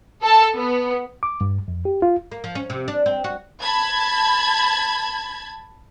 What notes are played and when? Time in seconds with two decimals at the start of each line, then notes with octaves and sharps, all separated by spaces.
0.22 A4 A5
0.56 B3
1.23 D6
1.41 G2
1.68 F2
1.85 G4
2.02 F4
2.31 A#3
2.44 F3
2.55 C#4
2.70 C3
2.88 D4
3.06 C4
3.24 F#4
3.62 A5 B5 G#6